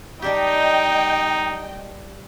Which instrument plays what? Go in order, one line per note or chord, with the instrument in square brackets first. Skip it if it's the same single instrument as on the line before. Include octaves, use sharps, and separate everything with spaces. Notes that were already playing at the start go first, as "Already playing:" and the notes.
[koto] G3 D4 G4 [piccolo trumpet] D#4 [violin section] D#5 G5